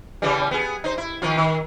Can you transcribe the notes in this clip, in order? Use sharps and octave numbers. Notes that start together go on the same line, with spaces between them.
C#3 E3 G3
B3 G#4
D#4 C5
E4
D#3 F3 F4
D#3